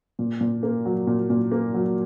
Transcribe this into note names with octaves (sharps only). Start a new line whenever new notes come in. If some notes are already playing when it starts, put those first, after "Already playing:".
A#2
A#2
A#3
F#3
A#2
A#2
A#3
F#3